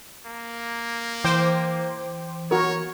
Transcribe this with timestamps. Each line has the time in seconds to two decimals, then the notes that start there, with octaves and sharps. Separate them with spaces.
0.26 A#3
1.24 E3 C5 G5 D6
2.51 F#4 A#4 C#5